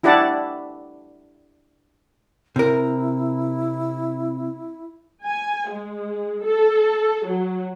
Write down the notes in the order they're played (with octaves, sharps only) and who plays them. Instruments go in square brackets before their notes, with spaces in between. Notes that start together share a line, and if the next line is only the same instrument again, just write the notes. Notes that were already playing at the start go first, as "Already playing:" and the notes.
[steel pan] D4 E4 G4 D5 F#5 A5
[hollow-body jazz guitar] C3 A#4 [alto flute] E4
[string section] G#5
G#3
A4
F#3